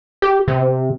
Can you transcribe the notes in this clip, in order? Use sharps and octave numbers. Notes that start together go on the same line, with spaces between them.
G4
C3